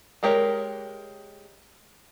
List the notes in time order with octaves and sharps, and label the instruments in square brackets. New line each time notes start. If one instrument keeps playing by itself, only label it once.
[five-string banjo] G#3 G4 A#4 C#5